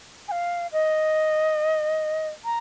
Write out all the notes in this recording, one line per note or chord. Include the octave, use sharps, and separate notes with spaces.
G#5
F5
D#5
A#5